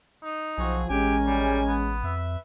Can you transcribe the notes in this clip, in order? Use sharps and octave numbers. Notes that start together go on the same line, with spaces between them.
D#4
B1 F3 C4 F#4 G#4
A1 G#3 C#4 G4 A#4 G#5
G3
B3
F2 B4 E5